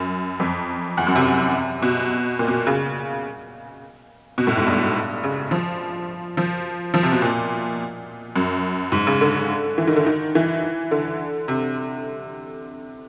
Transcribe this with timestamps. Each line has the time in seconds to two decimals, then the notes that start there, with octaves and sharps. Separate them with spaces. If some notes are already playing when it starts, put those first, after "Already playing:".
Already playing: F#2
0.40 F2
0.97 E2
1.07 F#2
1.16 C3
1.82 B2
2.39 A#2
2.48 B2
2.67 C#3
4.38 B2
4.47 A2
4.57 G#2
4.67 G2
5.23 C#3
5.51 F3
6.37 F3
6.94 F3
7.03 C3
7.12 B2
7.22 A#2
8.36 F#2
8.92 G#2
9.07 C#3
9.21 D3
9.78 E3
9.87 D#3
9.96 D3
10.06 D#3
10.35 E3
10.91 D3
11.48 C3